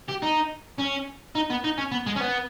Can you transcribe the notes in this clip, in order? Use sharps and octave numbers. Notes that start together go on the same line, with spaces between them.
G4
D#4
C#4
D#4
B3
D#4
C#4
B3
G#3
C#4
B3